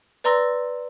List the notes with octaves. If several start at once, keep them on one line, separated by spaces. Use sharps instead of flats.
B4 D5 A#5 C6 E6 A#6